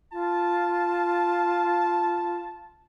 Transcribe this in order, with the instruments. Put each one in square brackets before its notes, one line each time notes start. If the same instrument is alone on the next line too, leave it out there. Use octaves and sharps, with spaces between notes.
[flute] F4 [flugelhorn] A5